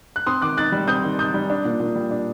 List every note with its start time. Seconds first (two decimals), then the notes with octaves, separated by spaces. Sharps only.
0.16 F#6
0.26 C4 C6 D#6
0.42 D#3 D6 F#6
0.57 D#4 F#6 A6
0.72 G3
0.88 C4 D#6 G6
1.03 D#3
1.18 D#4 D#6 G6
1.34 G3
1.50 D4
1.65 A#2
1.80 A#2
1.95 G3
2.11 D4